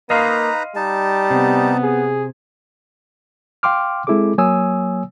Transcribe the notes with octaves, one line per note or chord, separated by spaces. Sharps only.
A#3 D#4 B4 D#5 F5 A#5 C6
G3 D#4 A5
C3 B3
G#4
F5 G5 C6 D6 F6
G#3 C4 E4 G#4 A4 D6
F#3 A#3 C#5 G#5 D#6 E6